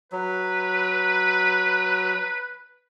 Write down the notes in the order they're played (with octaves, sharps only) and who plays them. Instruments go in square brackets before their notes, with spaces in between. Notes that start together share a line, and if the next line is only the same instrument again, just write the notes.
[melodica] F#3 [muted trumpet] B4